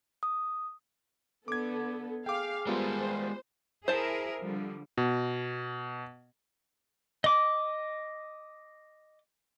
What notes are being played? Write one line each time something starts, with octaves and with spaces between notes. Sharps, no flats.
D#6
D3 B3 A4 D6 G#6
G#4 F5 G5 D6
G3 G#3 B3 F4 A#4 C5
E4 G#4 A#4 C5 A5
D3 F3 G3
B2
D#5 D6